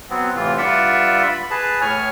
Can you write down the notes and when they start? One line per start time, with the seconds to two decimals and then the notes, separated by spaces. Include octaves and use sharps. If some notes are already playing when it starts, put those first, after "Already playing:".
0.10 F#3 B3 C4
0.36 A2 C3 E3 F4
0.58 G2 F4 D5 E5 F#5 E6
1.27 B5
1.51 G#4 B4 A5
1.81 A2 C#5 G#5 F6